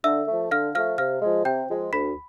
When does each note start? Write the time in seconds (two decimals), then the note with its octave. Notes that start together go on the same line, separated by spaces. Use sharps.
0.04 D3 E5 E6
0.28 F3 A3
0.51 D3 F5 F6
0.75 F3 A3 F5 F6
0.98 C3 F5 F6
1.22 F3 G#3
1.45 C3 G5 G6
1.69 F3 G#3
1.93 D2 B5 B6